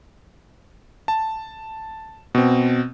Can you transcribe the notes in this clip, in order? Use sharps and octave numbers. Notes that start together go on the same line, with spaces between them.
A5
B2 C4